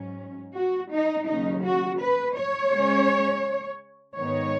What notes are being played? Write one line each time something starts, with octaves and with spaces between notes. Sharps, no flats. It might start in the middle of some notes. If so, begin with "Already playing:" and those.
Already playing: G#2 F#3 C#4
F#4
D#4
D#2 C#3 F#3 C#4 D#4
F#4
B4
C#5
C#3 G#3 C#4
G#2 D#3 B3 D#4 C#5